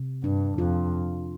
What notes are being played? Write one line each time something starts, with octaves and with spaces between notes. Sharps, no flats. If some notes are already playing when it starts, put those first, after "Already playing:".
Already playing: C3
G2 D4
F2 F4